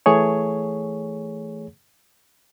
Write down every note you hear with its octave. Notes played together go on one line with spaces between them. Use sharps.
E3 A3 G#4 C#5